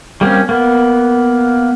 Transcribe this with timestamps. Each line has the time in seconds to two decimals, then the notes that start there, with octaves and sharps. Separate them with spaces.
0.21 G3 A#3 C4 C#4
0.49 A#3 B3